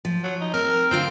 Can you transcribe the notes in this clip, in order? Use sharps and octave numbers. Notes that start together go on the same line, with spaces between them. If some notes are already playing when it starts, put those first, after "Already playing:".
F3
F#3
D#4
C4 A#4
D3 C4 F4 F5